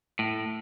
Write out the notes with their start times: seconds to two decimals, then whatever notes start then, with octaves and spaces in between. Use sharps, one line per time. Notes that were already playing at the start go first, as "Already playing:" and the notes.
0.19 A2